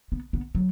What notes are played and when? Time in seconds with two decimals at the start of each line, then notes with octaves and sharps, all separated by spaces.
0.12 B3
0.33 B3
0.55 F#3